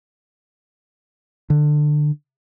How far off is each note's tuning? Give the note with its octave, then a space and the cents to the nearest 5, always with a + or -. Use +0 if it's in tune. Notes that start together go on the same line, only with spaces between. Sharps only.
D3 +20